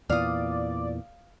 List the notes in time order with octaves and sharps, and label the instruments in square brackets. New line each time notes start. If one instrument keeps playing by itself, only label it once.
[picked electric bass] E2 A#2 E3 [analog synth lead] D5 [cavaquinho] F5 D#6